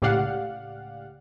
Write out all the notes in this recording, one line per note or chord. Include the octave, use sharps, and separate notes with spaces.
C#2 A2 G4 D5 F5 F#5